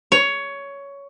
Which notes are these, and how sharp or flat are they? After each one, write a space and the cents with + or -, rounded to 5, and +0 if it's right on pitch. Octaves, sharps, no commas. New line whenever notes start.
C#5 +15